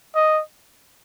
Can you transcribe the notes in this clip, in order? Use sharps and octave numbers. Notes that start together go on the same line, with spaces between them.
D#5